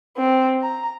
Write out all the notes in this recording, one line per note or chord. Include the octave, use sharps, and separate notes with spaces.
C4
A#5